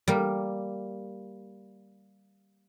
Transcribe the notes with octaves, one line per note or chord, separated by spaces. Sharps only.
G3 A#3